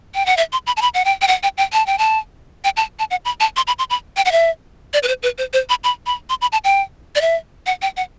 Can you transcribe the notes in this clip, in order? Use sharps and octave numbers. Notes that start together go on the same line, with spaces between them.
G5
F#5
E5
C6
B5
A5
B5
F#5
G5
G5
F#5
G5
G5
A5
G5
A5
G5
A5
A5
F#5
B5
A5
C6
B5
C6
B5
G5
F#5
E5
D5
B4
C5
B4
C5
C5
B5
B5
B5
C6
B5
A5
G5
D5
E5
F#5
G5
F#5